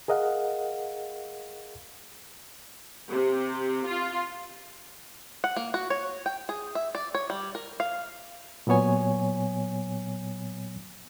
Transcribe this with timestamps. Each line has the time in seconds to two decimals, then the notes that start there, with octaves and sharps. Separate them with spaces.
0.08 G#4 A#4 D#5 F5 F#5
3.09 C3
3.86 F4
5.44 F#5
5.56 A#3
5.74 F#4
5.90 C#5
6.26 G5
6.49 G#4
6.75 E5
6.95 D5
7.15 C#5
7.30 G3
7.55 A#4
7.80 F5
8.67 A#2 F#3 B3 C#5 G#5